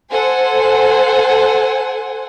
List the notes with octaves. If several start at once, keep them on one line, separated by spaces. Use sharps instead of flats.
A4 C5 F#5 G#5